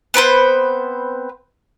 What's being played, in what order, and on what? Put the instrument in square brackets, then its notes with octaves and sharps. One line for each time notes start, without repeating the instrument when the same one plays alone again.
[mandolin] B3 C4 B4 C5